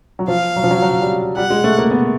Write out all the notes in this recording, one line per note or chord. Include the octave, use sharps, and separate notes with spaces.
F#3
F3 F5
F#3
F3
F#3
F#3
G3
G3 F#5
G#3
A3
A#3
B3